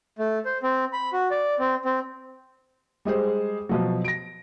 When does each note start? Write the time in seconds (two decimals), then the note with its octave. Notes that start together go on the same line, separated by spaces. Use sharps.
0.19 A3
0.45 C5
0.63 C4
0.93 B5
1.13 F#4
1.31 D5
1.59 C4
1.85 C4
3.05 G3 G#3 G#4 C5
3.69 B2 F3 F#3
4.04 A#6 D7